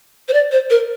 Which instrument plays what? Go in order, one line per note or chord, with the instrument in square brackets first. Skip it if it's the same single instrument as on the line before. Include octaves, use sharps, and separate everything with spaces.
[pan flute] C5
D5
C5
A#4